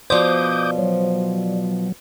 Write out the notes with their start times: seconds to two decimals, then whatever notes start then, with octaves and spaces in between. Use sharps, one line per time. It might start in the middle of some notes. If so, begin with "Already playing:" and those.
0.10 B2 F3 C5 D5 D6 D#6 G6
0.78 F#3